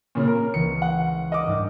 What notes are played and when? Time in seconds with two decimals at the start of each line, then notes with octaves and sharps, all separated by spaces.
0.15 A#2 C#3
0.28 A#4
0.54 C#2 E3 C#7
0.82 F#5
1.32 A#4 D#5 A5 D6 F6
1.46 G#2 G3 D4